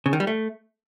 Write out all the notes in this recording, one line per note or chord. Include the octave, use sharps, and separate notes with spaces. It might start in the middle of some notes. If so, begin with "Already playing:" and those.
C#3
D#3
G3
A3